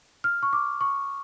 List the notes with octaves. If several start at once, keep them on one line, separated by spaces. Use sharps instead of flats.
F6
C#6
D6
C#6